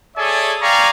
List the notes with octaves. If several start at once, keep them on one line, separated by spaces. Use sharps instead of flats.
G#4 A4 C#5 D5 E5 G#5
D5 F5 G5 G#5 A#5 C#6